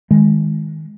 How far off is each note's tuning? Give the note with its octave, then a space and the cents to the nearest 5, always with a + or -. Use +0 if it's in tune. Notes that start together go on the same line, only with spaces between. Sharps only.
D#3 +15 G#3 +0